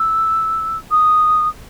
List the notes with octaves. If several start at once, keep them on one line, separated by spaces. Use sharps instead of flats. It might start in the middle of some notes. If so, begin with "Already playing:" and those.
Already playing: E6
D#6